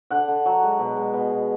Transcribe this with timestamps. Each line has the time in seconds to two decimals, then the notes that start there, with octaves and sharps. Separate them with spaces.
0.10 D3 F#5
0.28 D3
0.46 F#3
0.63 G#3
0.79 B2
0.97 G#3
1.14 B2
1.32 B2